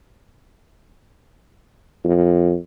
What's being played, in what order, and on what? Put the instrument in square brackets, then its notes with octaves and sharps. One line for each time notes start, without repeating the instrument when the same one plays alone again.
[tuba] F2